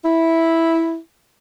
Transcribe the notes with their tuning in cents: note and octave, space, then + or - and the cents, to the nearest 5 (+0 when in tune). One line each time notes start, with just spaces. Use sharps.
E4 -5